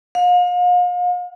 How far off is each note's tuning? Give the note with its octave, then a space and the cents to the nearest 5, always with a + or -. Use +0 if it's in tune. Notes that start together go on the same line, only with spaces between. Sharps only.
F5 +40